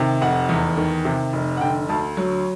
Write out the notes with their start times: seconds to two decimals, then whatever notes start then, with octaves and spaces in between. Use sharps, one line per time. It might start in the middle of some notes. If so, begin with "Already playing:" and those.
Already playing: C3 D#3
0.22 F1 F#5
0.49 E2
0.77 D#3
1.05 C3
1.33 F1
1.57 F#5
1.61 D3 G5
1.89 D2 A5
2.17 F#3